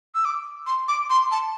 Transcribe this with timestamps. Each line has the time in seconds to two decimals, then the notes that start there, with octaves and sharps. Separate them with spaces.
0.14 E6
0.25 D6
0.66 C6
0.88 D6
1.10 C6
1.31 A5